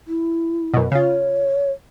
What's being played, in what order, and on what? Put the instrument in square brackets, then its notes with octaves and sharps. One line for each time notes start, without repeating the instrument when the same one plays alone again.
[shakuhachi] E4
[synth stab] F#2 B2
[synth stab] C#3 F4 [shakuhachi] C#5